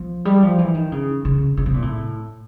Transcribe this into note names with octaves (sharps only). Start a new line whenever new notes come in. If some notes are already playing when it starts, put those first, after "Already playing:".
Already playing: F3
G3
F3
E3
D#3
C#3
C#3
C#3
C3
A#2
A2